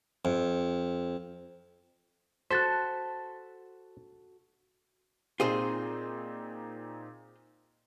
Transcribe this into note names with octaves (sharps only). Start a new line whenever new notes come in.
F2
F#4 A4 C5 F#6 A6 B6
A#2 C4 D#4 F4 G#4 C5